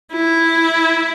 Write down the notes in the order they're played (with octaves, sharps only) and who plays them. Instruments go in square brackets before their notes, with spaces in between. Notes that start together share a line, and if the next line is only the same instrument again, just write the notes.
[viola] E4